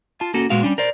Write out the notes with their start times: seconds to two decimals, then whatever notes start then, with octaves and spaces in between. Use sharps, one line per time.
0.21 F4 A5
0.34 A#3 C#4 F#4 A4
0.50 A#2 G#3 B3 F#4 F5
0.63 G3 C#4 D4
0.78 A#4 C5 D5